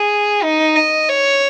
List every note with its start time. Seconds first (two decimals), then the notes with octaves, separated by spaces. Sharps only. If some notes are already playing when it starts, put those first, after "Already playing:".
Already playing: G#4
0.43 D#4
0.76 D#5
1.10 C#5